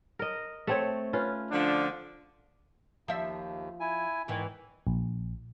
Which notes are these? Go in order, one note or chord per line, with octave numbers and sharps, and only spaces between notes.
A#4 D#5
A3 C4 C#5
C#4 F4 B4
D3 F3 D4
D#2 F3 E5
E4 G#5
E2 G#2 D#3 E3
A#1